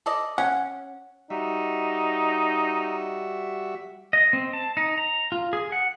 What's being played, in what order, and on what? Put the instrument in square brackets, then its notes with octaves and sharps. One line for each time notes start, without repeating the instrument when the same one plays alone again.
[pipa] A4 D5 D#5
[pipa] C#4 [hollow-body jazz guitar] F#5
[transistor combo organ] G3 F#4 E5 [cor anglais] D#4
[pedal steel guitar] D#5
C4
A5
D#4
A#5
F4
G#4
F#5